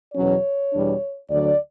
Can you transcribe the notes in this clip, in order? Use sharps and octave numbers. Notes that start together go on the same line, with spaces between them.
E2 B2 F#3 C#4 C#5
E2 B2 G3 D4
D2 D3 F#3 D5